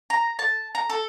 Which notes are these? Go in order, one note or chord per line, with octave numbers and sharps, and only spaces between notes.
A#5
A5
A#5
A4